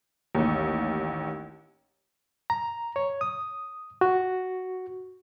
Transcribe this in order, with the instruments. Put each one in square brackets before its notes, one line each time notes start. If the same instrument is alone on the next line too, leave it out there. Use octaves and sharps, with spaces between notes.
[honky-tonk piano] A1 D#2
[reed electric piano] A#5
C#5
D#6
F#4